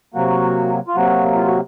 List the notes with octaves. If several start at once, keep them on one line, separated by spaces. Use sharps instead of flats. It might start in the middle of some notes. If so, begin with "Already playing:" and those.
C3 F#3 A#3 F#4
F4
C3 F#3 A#3 F#4
F4
F#4